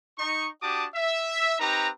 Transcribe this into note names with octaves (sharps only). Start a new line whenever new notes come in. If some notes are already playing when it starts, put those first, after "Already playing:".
D#4 C#6
D4 F#4 G4 A5 D6 D#6
E5
C4 D#4 G4 B4 A#5